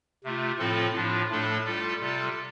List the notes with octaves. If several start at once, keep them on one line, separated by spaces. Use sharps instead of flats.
C3 A3 F4
A2 F3 C4 F4 A4
A2 F3 D4 F4
A2 A3 D4 A4
G3 F4 A4
C3 G3 F4 A4